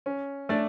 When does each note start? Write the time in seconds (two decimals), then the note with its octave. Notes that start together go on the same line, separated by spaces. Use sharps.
0.06 C#4
0.49 A3 D4 D5